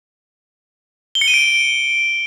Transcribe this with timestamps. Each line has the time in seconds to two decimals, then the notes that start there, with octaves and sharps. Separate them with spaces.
1.15 G7
1.21 C#7
1.28 D#7
1.34 D7